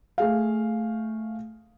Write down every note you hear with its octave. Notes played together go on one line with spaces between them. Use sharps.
A3 G#4 F5